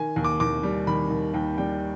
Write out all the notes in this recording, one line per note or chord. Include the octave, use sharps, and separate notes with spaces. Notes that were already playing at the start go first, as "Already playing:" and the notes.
Already playing: D#3 G#5
D#2
D6
D#2 D6
G3
D#3 B5
D#2
D#2 G5
G3 G5